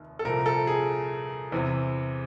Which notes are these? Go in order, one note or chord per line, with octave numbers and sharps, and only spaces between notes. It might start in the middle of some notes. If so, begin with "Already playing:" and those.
Already playing: F1 D#2
A4
C2 A#2 F3 A#4
A4
G#4
E2 C3 E3